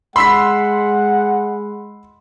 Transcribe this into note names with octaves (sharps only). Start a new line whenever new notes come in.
G#3 F#5 B5 C6 E6 B6